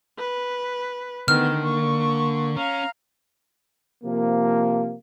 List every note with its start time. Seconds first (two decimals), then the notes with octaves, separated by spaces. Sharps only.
0.18 B4
1.28 D3 D#3 A3 B3 F6
1.63 A#3 C#6
2.56 C#4 F5 A#5
4.04 C3 F3 A#3